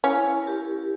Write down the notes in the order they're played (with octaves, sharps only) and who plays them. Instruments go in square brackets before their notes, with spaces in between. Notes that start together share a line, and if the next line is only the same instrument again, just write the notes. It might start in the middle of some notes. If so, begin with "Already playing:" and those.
[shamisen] C#4 [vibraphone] E4
[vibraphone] G4 A#4